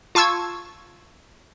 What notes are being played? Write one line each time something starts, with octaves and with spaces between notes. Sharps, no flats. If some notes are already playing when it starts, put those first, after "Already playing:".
F4 A5 C#6 E6 G#6